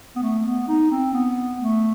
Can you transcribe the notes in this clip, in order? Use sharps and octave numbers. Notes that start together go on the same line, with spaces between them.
B3
A3
B3
D#4
C4
B3
A3